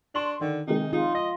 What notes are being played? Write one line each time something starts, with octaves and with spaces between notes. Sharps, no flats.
D4 C6 C#6 F#7
D3 D#3
C3 D#3 G#3 D#4
D#4 F4
D#5 A#6